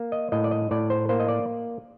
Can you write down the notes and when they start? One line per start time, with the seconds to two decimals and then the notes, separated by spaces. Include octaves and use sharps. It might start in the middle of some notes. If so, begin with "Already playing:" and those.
Already playing: A#3
0.12 D#5
0.32 A2 D#5
0.44 D5
0.51 D#5
0.71 A2 D5
0.90 C5
1.09 A#3 C5
1.20 D#5
1.29 D5